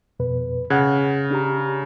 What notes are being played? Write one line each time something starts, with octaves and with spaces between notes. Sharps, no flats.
F2 B2 B4
C#3 F#5 F#6 G#6
D4 G4 A#5